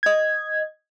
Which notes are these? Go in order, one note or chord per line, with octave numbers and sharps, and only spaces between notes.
D#5 G#6